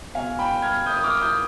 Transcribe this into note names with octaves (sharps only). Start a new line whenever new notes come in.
B2 F5 G#5
G5 B5
F6 G#6
D#6 G6
D#6
D6 F6
D#6 G6